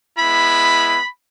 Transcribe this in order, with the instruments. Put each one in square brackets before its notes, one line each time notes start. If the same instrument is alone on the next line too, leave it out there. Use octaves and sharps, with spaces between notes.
[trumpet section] G#3 B3 E4 B5